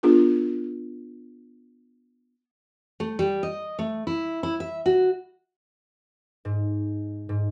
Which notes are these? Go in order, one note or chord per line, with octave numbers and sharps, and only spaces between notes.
B3 D4 F4 G#4 A#4
A3
G3
D#5
A3
E4
E4
E5
F#4
G#2
G#2